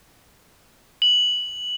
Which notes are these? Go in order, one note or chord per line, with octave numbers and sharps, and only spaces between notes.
F#7